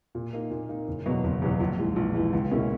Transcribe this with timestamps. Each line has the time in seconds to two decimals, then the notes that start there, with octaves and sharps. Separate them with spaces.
0.15 A#2
0.33 A#3 D#4
0.50 A#2
0.69 A#3 D#4
0.88 F#1
1.06 E2 B2 F#3
1.24 F#1
1.42 E2 B2 F#3
1.60 A#1
1.78 G#2 E3
1.96 A#1
2.14 G#2 E3
2.33 C#2
2.51 B2 A#3 C#4 E4